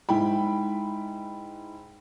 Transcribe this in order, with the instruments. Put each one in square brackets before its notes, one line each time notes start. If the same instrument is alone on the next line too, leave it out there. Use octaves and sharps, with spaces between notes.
[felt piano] G#2 E4 G5 B5